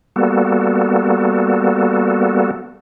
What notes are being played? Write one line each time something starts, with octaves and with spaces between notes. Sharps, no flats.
G3 A#3 B3 F#4 A4